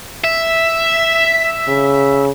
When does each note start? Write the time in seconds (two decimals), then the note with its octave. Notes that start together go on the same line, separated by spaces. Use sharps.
0.24 E5
1.68 C#3